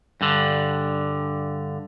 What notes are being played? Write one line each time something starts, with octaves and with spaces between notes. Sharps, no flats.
G2 D3